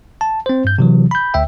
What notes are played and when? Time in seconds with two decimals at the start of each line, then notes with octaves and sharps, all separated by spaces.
0.21 A5
0.46 C4 C5
0.65 G2 G6
0.78 C3 E3 F#3
1.11 B5 G6
1.34 D2 E5 G5